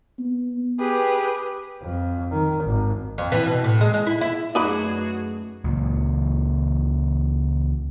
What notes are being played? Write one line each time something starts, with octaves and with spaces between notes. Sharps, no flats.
B3
G4 G#4 B4
F2
D#3
G#1
F2
E3
B2
A2
G#3
G#3
E4
E4
F#2 A3 D#4 F#4 G#4 B4 D5
C#2 A#2